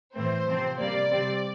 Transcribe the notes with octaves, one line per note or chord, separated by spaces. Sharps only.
A2 E3 A3 C4 C5
C3 F3 C4
C3 G3 A#3 D5
C3 G3 C4